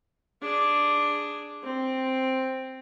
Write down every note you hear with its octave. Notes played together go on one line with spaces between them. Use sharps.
D4 G#4
C4